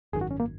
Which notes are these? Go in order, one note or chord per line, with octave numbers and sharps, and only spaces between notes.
G#1 F#2 D#3 G#4
F#4
C#4
A#3